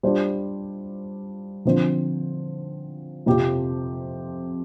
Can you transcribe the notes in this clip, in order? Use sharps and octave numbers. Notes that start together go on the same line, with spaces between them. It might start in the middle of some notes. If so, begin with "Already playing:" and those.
G3 D4 F4 C5
D3 F3 C4 F4 C5
F2 C3 F3 C4 G4